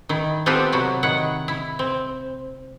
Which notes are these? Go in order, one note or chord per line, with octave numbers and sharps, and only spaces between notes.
D#3 E4
B3 C4 F4 G4 A4 B4
C3 F#3 E4 F#4
D#3 E4 F#5
E4
C4